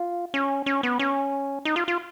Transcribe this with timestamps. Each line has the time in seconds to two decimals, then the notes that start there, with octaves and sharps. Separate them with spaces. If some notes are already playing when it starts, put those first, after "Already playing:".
Already playing: F4
0.34 C#4
0.66 C#4
0.83 B3
0.99 C#4
1.65 D#4
1.76 F4
1.88 F4